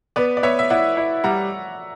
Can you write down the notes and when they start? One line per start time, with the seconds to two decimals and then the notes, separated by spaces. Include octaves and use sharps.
0.16 B3 B4 D5
0.37 D5
0.43 B3 C#5 E5
0.59 E5
0.70 E4 D5 F#5
0.97 E4
1.24 G3 F#5 A#5